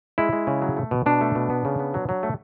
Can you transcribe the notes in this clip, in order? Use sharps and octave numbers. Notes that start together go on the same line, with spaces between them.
G#3 E4
G#3
C#3
F#3
A3
B2
B2 D4
A3
B2
B3
C#3
B3
F#3
F#3
A3